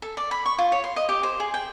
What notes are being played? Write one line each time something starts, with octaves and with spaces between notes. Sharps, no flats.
A4
D5
B5
C#6
F4
C#5
C6
D#5
G4
C5
G#4
G5